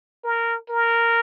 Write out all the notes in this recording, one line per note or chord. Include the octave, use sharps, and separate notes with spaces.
A#4
A#4